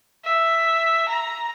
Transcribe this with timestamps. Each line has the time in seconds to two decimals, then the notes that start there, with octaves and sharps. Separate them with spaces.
0.25 E5
1.09 A#5